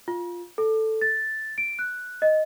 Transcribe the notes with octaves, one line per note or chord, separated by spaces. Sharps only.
F4
A4
A6
D7
F#6
D#5